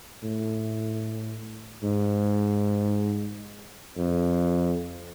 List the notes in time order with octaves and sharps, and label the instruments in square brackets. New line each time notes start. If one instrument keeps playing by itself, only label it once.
[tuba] A2
G#2
F2